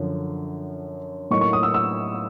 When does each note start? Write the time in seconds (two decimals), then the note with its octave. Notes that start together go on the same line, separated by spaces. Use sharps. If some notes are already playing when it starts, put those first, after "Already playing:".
Already playing: F#2 D3 F3
1.31 A2 F#3 A#3 D#4 C#6
1.41 C#6
1.53 D#6
1.63 E6
1.74 E6